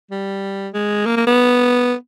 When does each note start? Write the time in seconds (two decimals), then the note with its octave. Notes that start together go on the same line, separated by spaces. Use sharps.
0.11 G3
0.74 G#3
1.06 A#3
1.17 A#3
1.27 B3